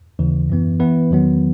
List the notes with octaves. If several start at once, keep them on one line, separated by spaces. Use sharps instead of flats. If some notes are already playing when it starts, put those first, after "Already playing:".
D#2 C#3 E3
F#2 E3 B3
E3 B3 E4 B4
E2 D#3 F#3 B3